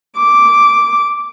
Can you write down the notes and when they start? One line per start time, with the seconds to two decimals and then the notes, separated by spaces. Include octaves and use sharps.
0.18 D6